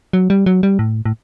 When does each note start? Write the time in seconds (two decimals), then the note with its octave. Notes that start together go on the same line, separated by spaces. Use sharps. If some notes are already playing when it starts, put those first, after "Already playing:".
0.13 F#3
0.30 G3
0.46 F#3
0.63 G3
0.79 A2
1.06 A2